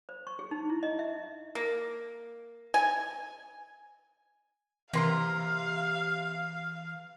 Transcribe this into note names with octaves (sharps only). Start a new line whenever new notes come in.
C5
C#6
G#4
D#4
E4
D#5
E5
A#3
G#5
C3 E3 A#3 E4 F5 A#5 C6